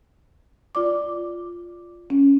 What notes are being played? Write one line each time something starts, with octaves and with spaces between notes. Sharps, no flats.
F4 D5 D6
C#4